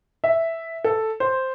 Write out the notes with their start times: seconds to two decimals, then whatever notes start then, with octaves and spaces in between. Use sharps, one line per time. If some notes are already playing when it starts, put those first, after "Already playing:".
0.24 E5
0.84 A4
1.20 C5